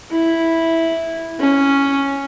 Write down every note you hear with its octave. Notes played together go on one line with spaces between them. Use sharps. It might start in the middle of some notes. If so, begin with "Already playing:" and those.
E4
C#4